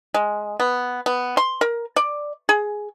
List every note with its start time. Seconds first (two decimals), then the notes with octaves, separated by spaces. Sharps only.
0.14 G#3
0.60 B3
1.06 B3
1.37 C6
1.61 A#4
1.96 D5
2.49 G#4